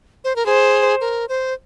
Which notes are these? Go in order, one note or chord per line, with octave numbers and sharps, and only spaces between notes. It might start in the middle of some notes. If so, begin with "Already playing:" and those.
C5
A#4
G#4 C5
A#4
C5